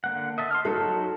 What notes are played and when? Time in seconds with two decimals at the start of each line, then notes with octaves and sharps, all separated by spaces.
0.04 D3 A#3 F#5
0.38 D#5 E5 A5
0.51 C6 D#6 F6
0.65 F#3 D#4 F#4 A4 A5